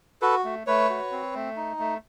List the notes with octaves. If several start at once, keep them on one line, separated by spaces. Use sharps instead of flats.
F#4 A4 B4
A3
A3 B4 C#5
F#4
C4
A3
D#4
A3